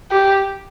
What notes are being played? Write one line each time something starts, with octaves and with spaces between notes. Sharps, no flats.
G4